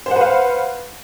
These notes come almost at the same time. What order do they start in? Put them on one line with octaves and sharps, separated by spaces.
C5 F#5 B4 F5